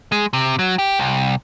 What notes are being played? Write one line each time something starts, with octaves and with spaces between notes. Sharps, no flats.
G#3
C3
F#3
G4
C2